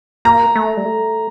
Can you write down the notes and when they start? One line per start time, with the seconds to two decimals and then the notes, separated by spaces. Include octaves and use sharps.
0.25 A#3 A#5
0.56 A3
0.77 G3
0.85 A3